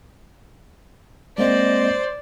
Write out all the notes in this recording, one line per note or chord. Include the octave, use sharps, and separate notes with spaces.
G#3 A#3 C4 C5 D5 D#5